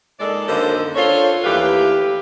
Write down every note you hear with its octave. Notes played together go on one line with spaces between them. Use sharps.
A#2 G#3 D#4 A4 D5
F#2 D3 D#3 A#3 A4 C5
D4 F4 A4 C5 C#5
D#2 E3 A3 G4 B4 F5